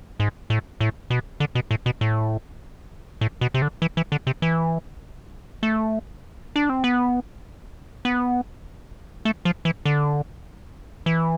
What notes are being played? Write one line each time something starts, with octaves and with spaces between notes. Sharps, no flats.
G#2
A2
A2
B2
D3
B2
A2
B2
A2
A2
B2
C3
D3
E3
E3
D3
C3
E3
A3
D4
C4
B3
B3
A3
F3
E3
D3
E3